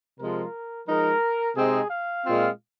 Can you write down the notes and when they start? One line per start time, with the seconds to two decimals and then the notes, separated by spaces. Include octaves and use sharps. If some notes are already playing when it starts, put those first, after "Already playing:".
0.20 C3 F3 G#3 F4 A#4
0.88 F3 G#3 D#4 A#4
1.56 C3 G#3 C4 D#4 G#4
1.90 F5
2.24 A#2 G#3 C4 F4